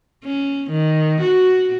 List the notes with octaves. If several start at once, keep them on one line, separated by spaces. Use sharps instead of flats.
C#4
D#3
F#4